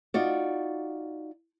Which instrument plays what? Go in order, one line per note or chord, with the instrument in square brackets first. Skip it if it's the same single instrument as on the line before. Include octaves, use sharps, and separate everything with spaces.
[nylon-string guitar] D#4 F4 F#4 D5